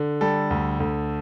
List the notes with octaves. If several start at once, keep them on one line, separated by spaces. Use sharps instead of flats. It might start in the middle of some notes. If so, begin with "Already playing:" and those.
Already playing: D3
G3 A4
D2
D2